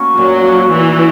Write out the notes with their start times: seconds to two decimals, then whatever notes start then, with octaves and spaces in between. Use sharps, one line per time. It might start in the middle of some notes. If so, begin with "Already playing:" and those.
Already playing: A#3 C#4 F#4
0.17 A#2 F#3
0.45 A#3 C#4 F#4
0.72 A#2 E3